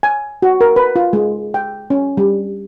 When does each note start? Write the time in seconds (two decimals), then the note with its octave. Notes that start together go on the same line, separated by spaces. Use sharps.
0.03 G#5
0.42 F#4
0.61 A#4
0.76 B4
0.96 F4
1.13 G#3
1.54 G5
1.90 C#4
2.17 G3